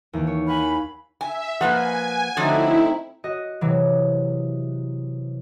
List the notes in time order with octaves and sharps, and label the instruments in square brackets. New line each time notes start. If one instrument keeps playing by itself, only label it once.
[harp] D#2 E3
C#5
[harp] F5 F#5 G#5 [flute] B5
[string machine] E5 [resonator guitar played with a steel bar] G#5
[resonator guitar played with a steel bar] F3 A#3 B4 [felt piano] F#5 [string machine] G#5
[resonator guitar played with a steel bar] D3 F3 F#3 [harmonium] A3 C4 D#4 [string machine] E4
[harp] F#4 D#5
C3 E3 F#3